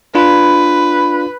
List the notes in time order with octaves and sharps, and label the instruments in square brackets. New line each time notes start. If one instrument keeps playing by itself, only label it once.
[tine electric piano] D4 F4 [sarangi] B4